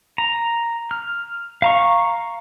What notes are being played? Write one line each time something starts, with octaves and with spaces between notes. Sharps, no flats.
A#5
F6
F5 A#5 C#6